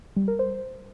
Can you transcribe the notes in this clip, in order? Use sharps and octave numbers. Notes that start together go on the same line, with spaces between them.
G3
A#4
C5